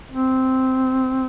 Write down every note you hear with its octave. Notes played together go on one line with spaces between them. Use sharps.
C4